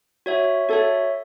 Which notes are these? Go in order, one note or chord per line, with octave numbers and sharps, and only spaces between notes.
F#4 C#5 E5
F#4 A4 C#5 E5